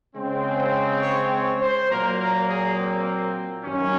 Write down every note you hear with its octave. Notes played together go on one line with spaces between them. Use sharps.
C#3 G#3 C4
C#5
C#5
C5
A#2 F#3 A#3 A#4
A#4
G#4
C4
F#2 D#3 F#3 A#3 C#4